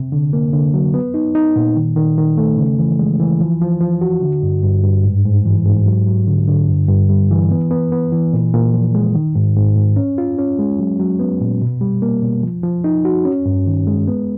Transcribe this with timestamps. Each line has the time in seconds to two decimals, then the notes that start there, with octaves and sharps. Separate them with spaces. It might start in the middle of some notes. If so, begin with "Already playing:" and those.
Already playing: C3
0.12 D3
0.33 A#3
0.53 D3
0.74 F#3
0.94 B3
1.14 D#4
1.35 D#4
1.56 A#2
1.76 D#3
1.96 D#3
2.18 D#3
2.37 A3
2.58 C#3
2.79 E3
2.99 G#3
3.20 E3
3.40 F3
3.61 F3
3.81 F3
4.01 F#4
4.22 D3
4.43 G2
4.63 G2
4.84 G2
5.04 G#2
5.25 G#2
5.45 E3
5.66 G#2
5.86 F#3
6.07 F#3
6.27 D3
6.48 D3
6.69 G2
6.89 G2
7.09 G3
7.31 E3
7.51 B3
7.71 B3
7.92 B3
8.12 E3
8.33 A#2
8.54 A#2
8.74 F3
8.95 G#3
9.15 D#3
9.35 G#2
9.56 G#2
9.76 G#2
9.96 C#4
10.18 F4
10.38 C#4
10.59 G#3
10.79 F#3
11.00 F#3
11.19 B3
11.41 A#2
11.61 B2
11.81 G3
12.02 A#3
12.22 B2
12.43 F3
12.63 F3
12.84 D#4
13.05 F#4
13.25 C#4
13.46 G2
13.67 D#3
13.87 G#3
14.08 B3